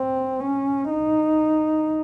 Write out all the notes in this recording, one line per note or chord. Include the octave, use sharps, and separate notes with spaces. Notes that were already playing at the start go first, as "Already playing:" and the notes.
Already playing: C4
C#4
D#4